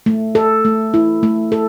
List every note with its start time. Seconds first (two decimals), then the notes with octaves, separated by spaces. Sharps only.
0.06 A3
0.35 A4
0.65 A3
0.94 E4
1.23 A3
1.52 A4